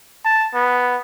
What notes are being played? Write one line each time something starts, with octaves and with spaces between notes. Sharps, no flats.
A5
B3